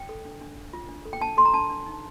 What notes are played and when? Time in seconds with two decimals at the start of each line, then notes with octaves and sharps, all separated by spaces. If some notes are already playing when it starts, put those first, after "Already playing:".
Already playing: G5
0.09 A4
0.25 D4
0.41 D4
0.56 D4
0.73 F4
0.89 D4
1.05 A4
1.13 G5
1.21 D4 A5
1.37 A4 C6
1.45 A#5
1.54 D4 A5
1.70 D4
1.86 D#4